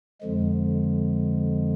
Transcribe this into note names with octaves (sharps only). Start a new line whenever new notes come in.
F2 D3 F3 G#3